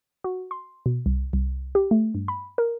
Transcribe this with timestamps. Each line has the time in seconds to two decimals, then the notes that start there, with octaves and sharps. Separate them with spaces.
0.24 F#4
0.51 C6
0.86 B2
1.06 C2
1.33 C2
1.75 G4
1.91 A3
2.15 G2
2.28 B5
2.58 A#4